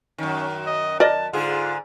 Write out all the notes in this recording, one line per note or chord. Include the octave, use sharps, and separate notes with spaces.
F#2 D#3 C#4
D#5
A#4 D5 D#5 A5
G#2 D3 F4 G#4